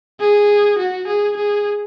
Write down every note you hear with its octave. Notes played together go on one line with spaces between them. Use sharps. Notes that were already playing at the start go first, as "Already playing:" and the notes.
G#4
F#4
G#4
G#4